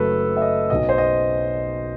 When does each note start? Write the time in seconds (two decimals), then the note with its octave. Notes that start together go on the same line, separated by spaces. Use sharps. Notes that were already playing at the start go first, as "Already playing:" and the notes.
Already playing: F#1 F#2 F#3 A3 A4 B4
0.37 E5
0.42 D#5
0.70 B1 B2 F#3 D#5
0.89 C5
0.98 D#5